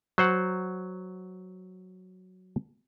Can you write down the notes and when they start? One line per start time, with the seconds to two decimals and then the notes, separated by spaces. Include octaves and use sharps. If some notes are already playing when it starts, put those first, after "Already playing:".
0.18 F#3 C5 F#5